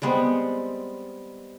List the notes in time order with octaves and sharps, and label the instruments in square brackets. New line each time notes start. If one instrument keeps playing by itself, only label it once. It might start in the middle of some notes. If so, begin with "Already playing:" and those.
[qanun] G3 G#3 B3 C4